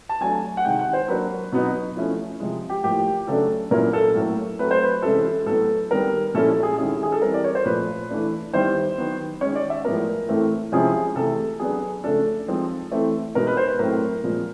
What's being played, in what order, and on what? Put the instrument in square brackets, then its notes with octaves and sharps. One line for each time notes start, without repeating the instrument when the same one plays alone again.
[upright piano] A5
F#3 A3 D4 G#5
F#5
C3 D#3 G#3 G5
F#5
C5
F#3 A#3 D4 B4
B2 F#3 B3 D#4
F3 A3 C#4 E4
C3 F3 G#3
G4
A2 F3 A#3 G4
C#3 F#3 A3 D4 A4
A#2 F#3 A#3 C#4 E4 A#4
A4
A2 F#3 A#3
F#3 A3 C4 B4
C5
B4
C3 E3 G#3 C#4 E4 A4
A4
A2 F#3 B3 A4
D#3 G3 B3 A#4
A#2 F3 G#3 C#4 E4 A4
A4
G#4
D#3 G#3 C#4 E4 G#4
G#4
A4
E3 G3 C4 A#4
D5
C#5
C5
A#2 F3 A3 B4
E3 A3 D4
D#3 G3 B3 E4 C5
D#3 F#3 B3
D#3 G#3 C#4 C#5
D5
E5
A2 F3 G#3 B3 A#4
A2 E3 A3 C4
C3 F3 G#3 C#4 E4 G#4
C3 E3 A3 A4
F#3 B3 D4 G#4
C#3 F3 A3 D4 A4
F3 G#3 C4 D#4
E3 A3 C4
B2 G#3 B3 D#4 A#4
B4
C5
B4
A2 F#3 A3 C4 A#4
A#2 F3 G#3